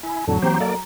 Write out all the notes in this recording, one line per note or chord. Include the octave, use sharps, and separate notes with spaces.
E4 G#5
F2 A2 D3 F#3 A5
E3 A#3 C4 G4 C5 A#5
A#3 A4 A#4 D5 D#5